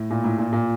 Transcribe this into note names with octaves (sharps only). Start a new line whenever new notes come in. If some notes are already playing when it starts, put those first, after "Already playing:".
Already playing: A2
A#2
A2
A#2
A#2